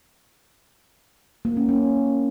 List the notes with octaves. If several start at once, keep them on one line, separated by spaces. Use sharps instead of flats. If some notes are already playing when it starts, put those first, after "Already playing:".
A#3
C#4
C#4